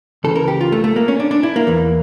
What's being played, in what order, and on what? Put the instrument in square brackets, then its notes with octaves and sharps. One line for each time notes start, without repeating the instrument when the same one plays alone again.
[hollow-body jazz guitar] C#2 C#3 E3 A4
A#4
G4
F4
A3
A3
A#3
C#4
D4
D4
E4
A#3
E2 E3